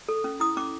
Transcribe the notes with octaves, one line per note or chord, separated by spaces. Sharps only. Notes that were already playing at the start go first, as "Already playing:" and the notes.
A4
C#4
E4 D#6
C#4 D6